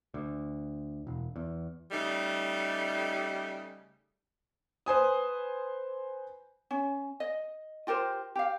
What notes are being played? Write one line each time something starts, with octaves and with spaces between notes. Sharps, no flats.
D2
E1
E2
C#3 G3 A3 D#4
B4 C5 G#5 D#6
C#4
D#5
F4 G4 A#4 C5
G4 F5